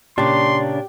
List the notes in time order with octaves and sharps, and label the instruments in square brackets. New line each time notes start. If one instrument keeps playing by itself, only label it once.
[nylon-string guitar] A#2 C#3 [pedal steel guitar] D4 [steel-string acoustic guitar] G4 [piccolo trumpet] C6